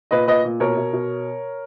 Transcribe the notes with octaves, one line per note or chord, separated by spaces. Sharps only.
A#2 B4 D#5
A#2 B4 D#5
A#2
B2 A#4 C#5
B2
B2